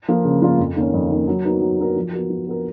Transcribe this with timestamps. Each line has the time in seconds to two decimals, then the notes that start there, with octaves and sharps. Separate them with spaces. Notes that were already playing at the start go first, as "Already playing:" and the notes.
0.08 F3 A#3 F4
0.25 C#3
0.42 F3 A#3 F4
0.59 F2
0.76 D#3 A#3 C#4
0.94 F2
1.11 D#3 A#3 C#4
1.27 F#3
1.45 B3 D#4 F#4 A#4
1.61 F#3
1.79 B3 D#4 F#4 A#4
1.96 F3
2.13 B3 F#4 A#4
2.30 F3
2.47 B3 F#4 A#4